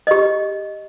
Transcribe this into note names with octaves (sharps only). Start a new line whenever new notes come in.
G4 D#5